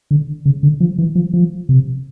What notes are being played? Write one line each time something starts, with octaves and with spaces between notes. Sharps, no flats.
D3
C#3
D3
F3
E3
F3
F3
C3